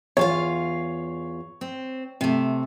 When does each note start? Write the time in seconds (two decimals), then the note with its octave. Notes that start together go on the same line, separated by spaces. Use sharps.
0.17 E2 F4 C#5 F5
1.61 C4
2.21 C3 A3